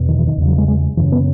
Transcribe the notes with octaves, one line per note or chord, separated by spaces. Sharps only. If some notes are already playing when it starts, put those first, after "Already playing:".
Already playing: E2 B2
D#3
E3
D#3
E2 C#3
F#3
G#3
G#3
F#2 C#3 E3
B3